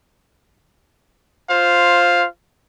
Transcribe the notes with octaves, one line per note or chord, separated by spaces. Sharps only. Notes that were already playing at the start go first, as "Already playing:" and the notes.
F4 C5 F5